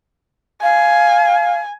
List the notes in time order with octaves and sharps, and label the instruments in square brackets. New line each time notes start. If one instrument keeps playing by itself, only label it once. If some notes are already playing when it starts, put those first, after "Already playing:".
[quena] F5 [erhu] G#5